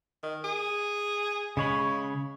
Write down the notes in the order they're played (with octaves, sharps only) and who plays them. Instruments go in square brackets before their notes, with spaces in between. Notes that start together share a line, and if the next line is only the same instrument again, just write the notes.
[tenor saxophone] D#3
G#4
[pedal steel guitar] C#3 C#5 B5 [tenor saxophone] G#3